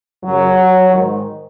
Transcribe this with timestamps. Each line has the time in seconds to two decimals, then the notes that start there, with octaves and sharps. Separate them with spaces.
0.23 F#2 C#3 F#3
0.93 G#2 D#3